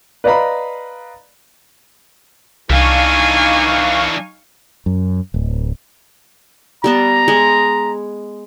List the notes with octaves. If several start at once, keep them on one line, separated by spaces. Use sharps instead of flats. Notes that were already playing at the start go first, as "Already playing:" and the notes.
B4 D5 D#5 F5 A#5 B5
C2 E3 D4 D#4 F5 G#5 C#6
F#2
D1
G3 B3 A5 A#5
G#3